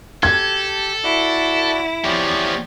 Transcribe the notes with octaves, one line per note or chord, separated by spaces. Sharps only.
G4 A4 G#6
E4 F#4 D5
E2 F3 G4 C#5 D5